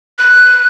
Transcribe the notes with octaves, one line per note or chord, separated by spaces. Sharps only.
F#6